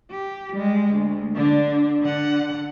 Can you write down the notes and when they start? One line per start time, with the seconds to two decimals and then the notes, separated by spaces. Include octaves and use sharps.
0.11 G4
0.54 G3 G#3
0.91 D2
1.35 D3 D4
2.02 D3 F#5